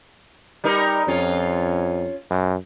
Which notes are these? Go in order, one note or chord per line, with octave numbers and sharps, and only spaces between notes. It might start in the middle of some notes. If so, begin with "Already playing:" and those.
G3 D#4 A#4
F2 C#4 F4
F#2